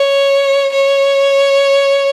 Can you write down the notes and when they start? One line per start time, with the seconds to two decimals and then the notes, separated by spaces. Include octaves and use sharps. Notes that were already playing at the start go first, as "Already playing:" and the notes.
Already playing: C#5
0.73 C#5